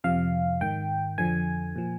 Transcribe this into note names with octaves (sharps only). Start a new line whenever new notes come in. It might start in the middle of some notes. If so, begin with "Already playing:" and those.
F2 C3 F3 F5
G#2 D#3 G5
F2 D3 F3 G#5
A#2 F3